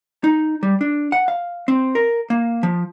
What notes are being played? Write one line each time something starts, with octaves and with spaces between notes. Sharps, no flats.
D#4
G3
D4
F#5
F5
C4
A#4
A#3
F3